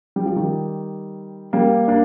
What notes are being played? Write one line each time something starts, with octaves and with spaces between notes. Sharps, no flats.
G3
F3
D#3 G3
G3 A#3
A#3 D4